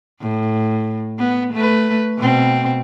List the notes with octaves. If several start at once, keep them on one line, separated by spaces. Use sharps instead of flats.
A2
B3
A3 B4
B2 C4